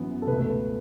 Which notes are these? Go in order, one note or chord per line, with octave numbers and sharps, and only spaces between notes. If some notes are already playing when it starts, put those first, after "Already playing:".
Already playing: F#2 E3 B3
A4
C#2 B2 A3 B4